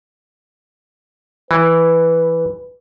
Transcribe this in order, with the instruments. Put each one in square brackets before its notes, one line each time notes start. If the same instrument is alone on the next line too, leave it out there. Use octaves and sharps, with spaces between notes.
[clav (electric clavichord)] E3 [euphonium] B4